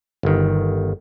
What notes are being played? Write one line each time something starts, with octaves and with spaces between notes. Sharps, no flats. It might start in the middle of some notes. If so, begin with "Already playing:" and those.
G1 D#3